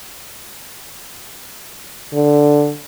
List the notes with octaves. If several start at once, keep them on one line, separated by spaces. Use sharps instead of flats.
D3